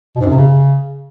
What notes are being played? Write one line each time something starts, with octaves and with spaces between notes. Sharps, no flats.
B2
G#2
F#2
C3
C#3